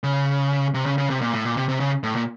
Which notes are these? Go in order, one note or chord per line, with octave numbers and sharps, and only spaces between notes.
C#3
C3
C#3
C#3
C3
A#2
A2
A#2
C3
C3
C#3
A2
A#2